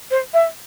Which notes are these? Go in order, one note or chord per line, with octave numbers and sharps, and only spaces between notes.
C5
E5